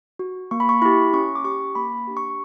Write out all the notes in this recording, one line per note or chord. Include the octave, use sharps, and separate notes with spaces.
F#4
A#3 C#6
B5
C#6
E4 G4 B5
C#4 C#6
D6
G4 C#6
A#3 B5
D4 G4
C#6